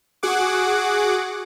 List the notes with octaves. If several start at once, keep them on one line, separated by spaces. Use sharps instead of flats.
F#4 G#4 F#5 D6